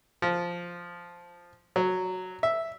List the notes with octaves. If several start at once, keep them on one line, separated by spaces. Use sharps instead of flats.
F3
F#3
E5